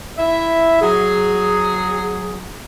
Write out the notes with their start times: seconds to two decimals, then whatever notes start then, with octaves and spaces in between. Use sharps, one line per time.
0.18 E4 E5
0.81 F#3 G#4